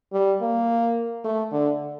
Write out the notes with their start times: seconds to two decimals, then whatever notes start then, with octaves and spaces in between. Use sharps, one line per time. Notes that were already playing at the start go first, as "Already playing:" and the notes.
0.13 G3
0.41 A#3
1.24 A3
1.52 D3